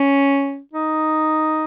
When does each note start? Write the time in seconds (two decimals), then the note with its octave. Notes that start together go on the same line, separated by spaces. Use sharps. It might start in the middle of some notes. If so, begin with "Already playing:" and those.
Already playing: C#4
0.73 D#4